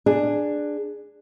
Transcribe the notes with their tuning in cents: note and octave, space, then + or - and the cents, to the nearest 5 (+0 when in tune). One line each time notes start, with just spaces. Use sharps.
D4 +10 G#4 +0